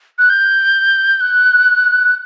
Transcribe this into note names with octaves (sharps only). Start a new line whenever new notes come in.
F#6
G6
F#6